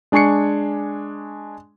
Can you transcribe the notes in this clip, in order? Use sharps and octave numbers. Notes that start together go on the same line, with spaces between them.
G#3 D4 G#5 C#6 C7 C#7